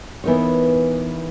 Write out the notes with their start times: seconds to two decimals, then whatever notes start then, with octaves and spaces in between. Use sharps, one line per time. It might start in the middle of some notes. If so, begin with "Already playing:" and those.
0.24 E3 B3 D#4 A#4 C#5